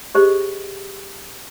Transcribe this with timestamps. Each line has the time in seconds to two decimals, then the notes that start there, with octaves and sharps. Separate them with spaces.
0.15 G4 G#4 C5 D#5